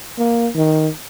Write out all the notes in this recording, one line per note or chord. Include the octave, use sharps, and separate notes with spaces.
A#3
D#3